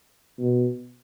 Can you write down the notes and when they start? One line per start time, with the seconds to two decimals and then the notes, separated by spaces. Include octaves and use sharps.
0.39 B2